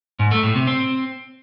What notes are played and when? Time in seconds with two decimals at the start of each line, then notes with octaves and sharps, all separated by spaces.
0.19 G#2
0.31 A3
0.43 A2
0.55 C3
0.67 C4